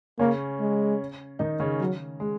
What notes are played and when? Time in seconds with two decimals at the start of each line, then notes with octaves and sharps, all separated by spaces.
0.19 C#3 A#3 C#4
0.60 G#3
1.39 D#3 D#4
1.60 C#3 C#4
1.80 F#3
2.20 G#3